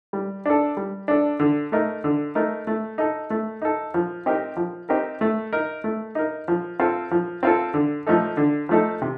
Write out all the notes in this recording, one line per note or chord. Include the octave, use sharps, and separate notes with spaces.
G3
D4 A4
G3
D4 A4
D3
A3 D#4 A#4
D3
A3 D#4 A#4
A3
D#4 A4
A3
D#4 A4
F3
C4 D#4 G4 A#4
F3
C4 D#4 G4 A#4
A3
D#4 A#4
A3
D#4 A#4
F3
C4 F4 A4
F3
C4 F4 A4
D3
F3 A3 D#4 A4
D3
F3 A3 D#4 A4
C3